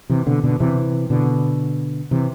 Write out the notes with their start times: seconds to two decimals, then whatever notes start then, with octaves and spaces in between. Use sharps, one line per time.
0.09 C3 E3
0.26 B2 D3
0.43 B2 D3
0.60 C3 E3
1.10 B2 D3
2.11 C3 E3